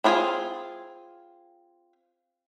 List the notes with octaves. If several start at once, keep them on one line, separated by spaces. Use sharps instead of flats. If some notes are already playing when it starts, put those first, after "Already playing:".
C4 D4 F4 G#4 G#5